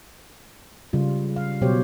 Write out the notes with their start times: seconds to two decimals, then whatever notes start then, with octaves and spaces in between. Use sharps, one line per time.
0.93 C#3 G3 F4
1.36 F5
1.61 B2 F#3 G4 C5 C#5